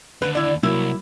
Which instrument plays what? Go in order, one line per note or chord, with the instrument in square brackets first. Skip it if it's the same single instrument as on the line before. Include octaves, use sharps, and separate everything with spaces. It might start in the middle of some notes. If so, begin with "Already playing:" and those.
[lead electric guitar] D#2 D3 [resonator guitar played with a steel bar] B4
[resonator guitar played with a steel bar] E4 D5
[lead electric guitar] C2 [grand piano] F#3 A#3 [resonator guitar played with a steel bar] E4